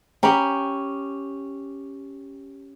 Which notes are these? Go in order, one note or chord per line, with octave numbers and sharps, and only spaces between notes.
C#4 G4 G5 A#5 B5